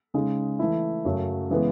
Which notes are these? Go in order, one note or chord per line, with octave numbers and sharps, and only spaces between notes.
C#3 G#3 D#4
E3 A3 E4
F#2 C#3 F#3 A3
C#3 E3 G#3 B3